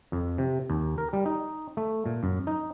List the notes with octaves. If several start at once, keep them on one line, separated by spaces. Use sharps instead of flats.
F2
C3
D#2
A#4
G3
D#4
A3
A#2
F#2
D#4